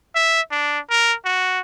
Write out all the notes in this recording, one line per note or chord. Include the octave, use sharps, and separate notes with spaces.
E5
D4
A#4
F#4